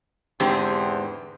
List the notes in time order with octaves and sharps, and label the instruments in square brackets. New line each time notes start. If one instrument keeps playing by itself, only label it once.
[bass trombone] E2 [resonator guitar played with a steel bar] G#2 D3 C4 [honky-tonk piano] G4